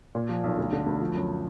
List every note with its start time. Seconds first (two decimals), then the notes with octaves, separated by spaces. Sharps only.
0.15 A#2
0.29 F3
0.44 B1
0.58 D2
0.73 D3
0.86 D2
1.01 F3
1.15 F#2